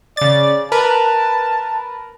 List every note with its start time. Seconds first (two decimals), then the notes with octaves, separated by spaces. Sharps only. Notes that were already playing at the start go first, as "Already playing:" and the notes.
0.17 C#3 D5 A6
0.72 A#4 B4 A5